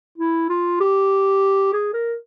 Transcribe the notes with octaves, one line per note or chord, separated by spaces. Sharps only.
E4
F4
G4
G#4
A#4